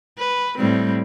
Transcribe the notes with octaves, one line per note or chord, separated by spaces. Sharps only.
B4
A2 G3 C4